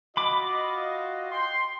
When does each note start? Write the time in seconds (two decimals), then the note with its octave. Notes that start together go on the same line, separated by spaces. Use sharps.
0.17 F4 F#4 D#5 B5 D6
1.32 G5 C6